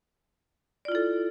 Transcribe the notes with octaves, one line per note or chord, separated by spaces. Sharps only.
E4 F4 A4 D5